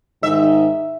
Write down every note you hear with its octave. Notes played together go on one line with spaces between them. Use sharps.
G#2 D#3 D#4 E5